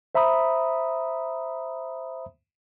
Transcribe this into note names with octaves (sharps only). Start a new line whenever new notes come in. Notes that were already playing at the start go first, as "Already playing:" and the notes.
C5 E5 A#5 B5 D#6